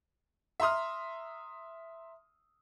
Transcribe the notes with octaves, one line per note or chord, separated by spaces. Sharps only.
E5 A#5 C6 D#6 F6